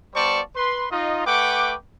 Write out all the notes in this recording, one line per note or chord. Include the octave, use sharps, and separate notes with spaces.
G3 B3 C5 D5 A5 C#6
B4 C6
D#4 F4 D#5
A3 B4 F#5 G5 D6